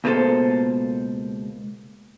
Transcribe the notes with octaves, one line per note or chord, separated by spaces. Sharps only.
C#2 B2 A#3 D#4 A4 C5